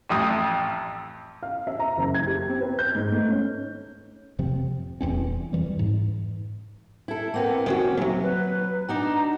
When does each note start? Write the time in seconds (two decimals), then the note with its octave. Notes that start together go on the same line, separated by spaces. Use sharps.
0.09 A1 F2 D#6
1.43 F5
1.67 E5
1.79 A#5
1.97 F#1
2.14 G#6
2.27 G4
2.49 C4
2.61 B4
2.79 G6
2.95 G#2
3.12 A3
3.28 C#4
4.39 F2 C3 F3 C4
5.01 D#1 E2 C4 C#4
5.53 F2 E3 G3
5.79 G#2
7.08 E4 A4
7.34 A#3 C4 B4 F#5
7.66 D#3 C4 C#4 F#4
7.98 D#2 C3 F#3
8.22 B4
8.88 D4 D#4 F#4 A#5